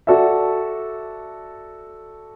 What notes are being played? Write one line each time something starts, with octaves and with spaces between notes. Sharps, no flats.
F#4 A4 D5 E5